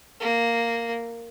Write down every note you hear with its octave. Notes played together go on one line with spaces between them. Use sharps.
A#3